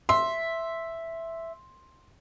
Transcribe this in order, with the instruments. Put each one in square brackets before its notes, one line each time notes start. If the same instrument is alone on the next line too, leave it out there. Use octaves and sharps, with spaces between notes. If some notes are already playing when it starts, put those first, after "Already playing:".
[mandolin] E5 [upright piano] C6